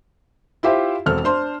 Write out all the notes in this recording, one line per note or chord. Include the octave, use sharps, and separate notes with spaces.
E4 F4 G4 C5 E5
E1 C4 A4 F6
D4 C5 C6